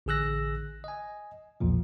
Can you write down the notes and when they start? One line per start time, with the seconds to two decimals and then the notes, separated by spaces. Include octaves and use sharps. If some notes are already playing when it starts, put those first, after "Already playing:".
0.06 A1 D3 G#4 E6 F#6 A#6
0.84 D#5 G#5
1.60 B1 E2 A#2 F3